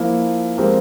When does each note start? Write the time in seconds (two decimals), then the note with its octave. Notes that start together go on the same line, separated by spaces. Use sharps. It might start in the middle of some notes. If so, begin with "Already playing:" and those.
Already playing: F3 A#3 E4
0.57 F3 G#3 C4 G4 A#4